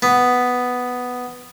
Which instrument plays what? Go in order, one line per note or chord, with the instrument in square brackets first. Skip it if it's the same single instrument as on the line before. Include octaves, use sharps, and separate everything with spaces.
[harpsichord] B3